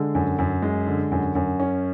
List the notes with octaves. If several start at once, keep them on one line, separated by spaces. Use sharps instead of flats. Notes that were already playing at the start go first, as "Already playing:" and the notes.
Already playing: D3 G#3
F#2
F#2
G#3
D3
F#2
F#2
C#4